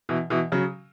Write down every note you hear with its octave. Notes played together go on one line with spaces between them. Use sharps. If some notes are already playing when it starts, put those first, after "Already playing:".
B2 E3
B2 E3
C#3 F#3